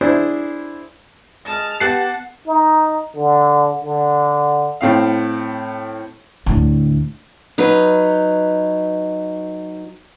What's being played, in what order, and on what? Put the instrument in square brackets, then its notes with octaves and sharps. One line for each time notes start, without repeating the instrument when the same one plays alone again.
[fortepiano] D4 E4 G#4 C5
[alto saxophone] G#3 [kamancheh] A5 F6 [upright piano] D#6 A#6
[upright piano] B3 [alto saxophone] G4 [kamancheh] F#5 A5 [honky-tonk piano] F#6 A6 C7
[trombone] D#4
D3
D3
[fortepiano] A2 C4 F5
[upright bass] D2 A2
[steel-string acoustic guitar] F#3 D#4 B4